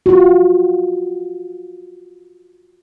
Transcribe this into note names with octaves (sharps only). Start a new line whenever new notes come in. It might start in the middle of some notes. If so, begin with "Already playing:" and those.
F4 F#4